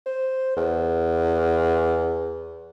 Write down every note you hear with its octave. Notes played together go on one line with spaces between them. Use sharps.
C5
E2